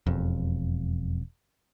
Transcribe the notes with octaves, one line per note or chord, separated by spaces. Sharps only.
E1 F2